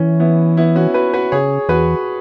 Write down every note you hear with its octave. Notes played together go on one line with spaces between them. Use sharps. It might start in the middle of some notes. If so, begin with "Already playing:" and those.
Already playing: E3 C#4
B3 E4
B3 E4
C#4 F#4
F#4 B4
F#4 B4
C#3 G#4 C#5
E2 F#4 B4